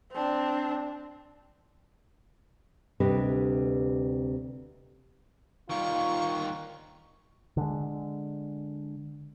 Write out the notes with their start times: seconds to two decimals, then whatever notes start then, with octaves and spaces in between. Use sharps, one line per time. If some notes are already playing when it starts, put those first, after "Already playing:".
0.12 C4 D4
3.00 D2 C3 G3 D4 B4 D#5
5.70 D#3 G3 F4 C#6
7.57 D3 G#3